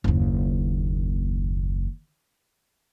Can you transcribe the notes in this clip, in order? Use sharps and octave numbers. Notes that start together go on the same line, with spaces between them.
F#1 D#2